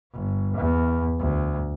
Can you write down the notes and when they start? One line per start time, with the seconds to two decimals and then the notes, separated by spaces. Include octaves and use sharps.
0.13 G1
0.57 E2
1.20 D2